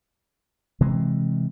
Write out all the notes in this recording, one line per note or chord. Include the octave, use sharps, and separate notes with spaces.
C3 E3 G#3